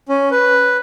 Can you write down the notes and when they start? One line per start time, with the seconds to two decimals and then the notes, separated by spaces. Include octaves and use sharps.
0.09 C#4
0.31 B4